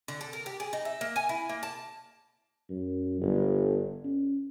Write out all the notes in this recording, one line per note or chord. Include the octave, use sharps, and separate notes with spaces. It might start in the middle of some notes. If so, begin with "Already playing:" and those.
D3
A4
A#4
G4
G#4
D#4
E5
A#3
G#5
E4
A#3
A5
F#2
G1
C#4